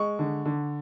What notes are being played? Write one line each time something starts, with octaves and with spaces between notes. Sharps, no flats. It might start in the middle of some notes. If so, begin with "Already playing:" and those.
Already playing: G#3 C#6
D3
D3